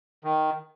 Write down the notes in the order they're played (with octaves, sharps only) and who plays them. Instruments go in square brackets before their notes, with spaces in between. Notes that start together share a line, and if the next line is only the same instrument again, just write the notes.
[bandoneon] D#3